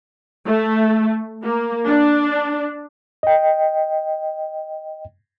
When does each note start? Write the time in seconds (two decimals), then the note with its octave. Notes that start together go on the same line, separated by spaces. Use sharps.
0.46 A3
1.44 A#3
1.86 D4
3.23 D#5 G5